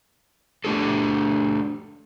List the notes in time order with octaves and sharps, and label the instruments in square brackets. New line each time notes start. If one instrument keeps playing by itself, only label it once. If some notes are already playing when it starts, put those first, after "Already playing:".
[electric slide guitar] A3 D4 G4 A4